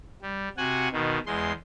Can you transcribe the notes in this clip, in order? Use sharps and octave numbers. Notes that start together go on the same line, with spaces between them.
G3
C3 F#4 F#5 G#5
B2 D#3
E2 G#3 C6